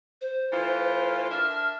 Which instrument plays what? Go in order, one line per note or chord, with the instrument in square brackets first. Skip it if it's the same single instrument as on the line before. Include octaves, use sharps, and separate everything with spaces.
[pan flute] C5
[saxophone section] E3 A3 F4
[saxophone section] D4 A#4 E5 [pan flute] F6